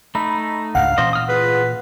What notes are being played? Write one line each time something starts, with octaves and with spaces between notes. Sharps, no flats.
A3 D#4 B5
C#2 G#2 D4 F5 F#5
A#2 E3 C#4 C5 D#5
D#6 F6
F4 G#4 B4